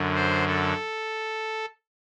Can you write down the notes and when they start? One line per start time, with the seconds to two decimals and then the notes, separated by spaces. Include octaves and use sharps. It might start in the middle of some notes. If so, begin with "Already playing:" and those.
Already playing: F#2 D3
0.15 C5
0.47 A4